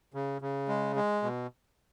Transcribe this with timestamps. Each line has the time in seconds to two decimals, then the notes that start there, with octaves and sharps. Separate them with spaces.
0.14 C#3
0.42 C#3
0.68 G#3
0.96 G#3
1.22 B2